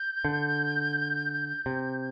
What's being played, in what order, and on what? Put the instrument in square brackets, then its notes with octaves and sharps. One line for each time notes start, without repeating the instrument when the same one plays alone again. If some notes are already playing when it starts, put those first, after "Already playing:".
Already playing: [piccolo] G6
[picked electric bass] D3
C3